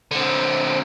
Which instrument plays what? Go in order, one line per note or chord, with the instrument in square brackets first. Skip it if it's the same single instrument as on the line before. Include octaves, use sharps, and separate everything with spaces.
[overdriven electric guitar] D3 C4